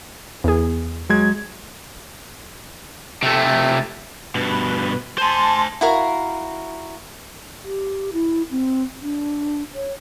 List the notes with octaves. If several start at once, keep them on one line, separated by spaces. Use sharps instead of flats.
E2 G#4
F#3 G#3 G#6
C3 A3
G2 B2 B4
C5 G#5 A5 C6
E4 F#4 A#4 F5
G4
E4
C4
D4
C#5